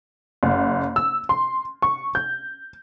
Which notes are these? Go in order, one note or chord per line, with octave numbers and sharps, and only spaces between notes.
F#1
E6
C6
C#6
G6